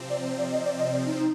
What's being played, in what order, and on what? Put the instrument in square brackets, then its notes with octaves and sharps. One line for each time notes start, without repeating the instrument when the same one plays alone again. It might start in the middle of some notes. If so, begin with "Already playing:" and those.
Already playing: [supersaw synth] C3 F3 C4
[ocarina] D5
D5
D#5
D5
D#5
D5
D#4
D#4